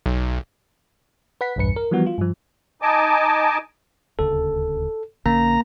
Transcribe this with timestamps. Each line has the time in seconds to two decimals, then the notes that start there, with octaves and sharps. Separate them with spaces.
0.06 B1
1.41 B4 F#5 B6
1.56 B1 E2 G2 B4 C#7
1.76 A#4
1.91 E3 F3 G3 B3 F#4
2.06 F4
2.18 G2 F3
2.82 D#4 D#5 G#5 A5 D6
4.19 D#1 D2 C#3 A4
5.26 A#1 D3 A#3 C#4 A#5